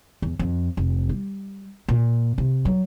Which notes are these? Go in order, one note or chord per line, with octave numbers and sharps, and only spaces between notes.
E2
F2
F1
G3
A#2
C3
F#3